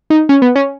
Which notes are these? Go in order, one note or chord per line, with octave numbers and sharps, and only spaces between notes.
D#4
C#4
B3
C#4